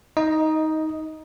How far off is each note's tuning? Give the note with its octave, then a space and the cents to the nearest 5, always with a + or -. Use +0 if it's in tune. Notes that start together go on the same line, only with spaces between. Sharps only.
D#4 +15 D#5 +0